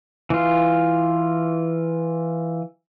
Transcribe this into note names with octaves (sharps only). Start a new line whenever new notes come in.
E3 F4